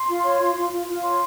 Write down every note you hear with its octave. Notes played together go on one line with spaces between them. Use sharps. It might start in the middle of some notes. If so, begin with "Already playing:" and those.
Already playing: C6
F4
C#5
F4
F4
F4
F4
C#5 C6